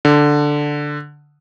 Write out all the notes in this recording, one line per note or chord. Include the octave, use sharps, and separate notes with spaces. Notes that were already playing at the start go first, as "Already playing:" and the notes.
D3